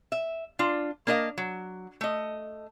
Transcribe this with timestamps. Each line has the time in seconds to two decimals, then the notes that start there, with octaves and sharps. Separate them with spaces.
0.12 E5
0.59 D4 F4
1.07 A#3 D4 A#4 D#5 F5
1.38 F#3
2.01 A3 D#5